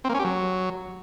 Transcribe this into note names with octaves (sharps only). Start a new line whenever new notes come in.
C4
A#3
C#4
G4
F#3